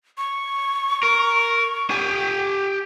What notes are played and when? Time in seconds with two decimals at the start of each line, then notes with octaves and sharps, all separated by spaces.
0.18 C#6
1.03 A#4
1.90 G4 G#5